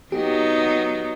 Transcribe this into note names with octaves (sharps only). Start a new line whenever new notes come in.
F#3 B3 D#4 G4